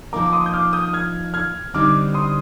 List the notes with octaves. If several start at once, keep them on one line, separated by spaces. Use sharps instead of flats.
F3 A#3 D#4 A#5 D6
D6
C6 D#6
G6
D6 F6
D#6 G6
F6 G#6
F6 G#6
D3 G3 C4 D#4 D6 F6
C6 D#6